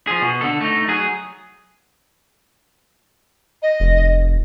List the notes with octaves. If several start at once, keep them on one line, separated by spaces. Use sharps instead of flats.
F3 G#4
B2
D3 A4
A3 D#4
F#3 G#4
D#5
F1